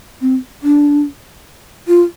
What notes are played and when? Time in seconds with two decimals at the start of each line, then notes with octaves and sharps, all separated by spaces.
0.22 C4
0.63 D4
1.88 F4